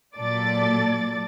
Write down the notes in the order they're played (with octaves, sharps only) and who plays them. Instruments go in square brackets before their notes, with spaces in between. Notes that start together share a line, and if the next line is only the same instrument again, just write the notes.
[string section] A#2 F#3 A4 D5 D6 A6